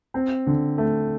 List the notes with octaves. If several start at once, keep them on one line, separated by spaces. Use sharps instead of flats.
C4
D3
A3